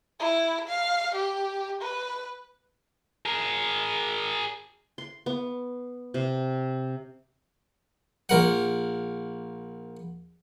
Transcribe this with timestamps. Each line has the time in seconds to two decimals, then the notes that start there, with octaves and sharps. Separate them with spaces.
0.20 E4
0.68 F5
1.15 G4
1.81 B4
3.26 G#4 A#4
4.98 C6
5.26 B3
6.14 C3
8.29 A#1 A#4 F#5